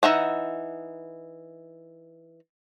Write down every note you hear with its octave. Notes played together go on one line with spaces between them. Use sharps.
E3 D#4 E5 F#5